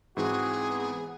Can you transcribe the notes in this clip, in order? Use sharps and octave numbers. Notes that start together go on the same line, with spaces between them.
G#2 E3 C4 F#4 G#4
B3